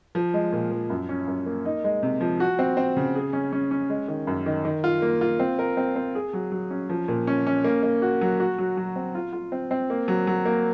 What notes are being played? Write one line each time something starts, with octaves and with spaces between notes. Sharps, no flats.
F3
G#3
A#2
F3
F#2
C#4
F#2
A#3
D#4
G#3
C3
F3
F#4
C4
C4
C#3
G#4
C#4
C#4
C#4
G#3
D#3
F#2
D#3
D#3
F4
A#3
F4
C4
A#4
C4
C4
G#4
F#3
F#3
C#4
F3
A#2
C#4
C#4
A#3
A#3
F#4
F#3
F#4
F#3
F#3
C4
F4
F4
C4
C4
A#3
F#3
F#3
A#3